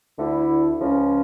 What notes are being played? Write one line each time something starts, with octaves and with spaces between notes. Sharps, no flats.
D2 D3 A3 E4
C#2 C#3 F3 C#4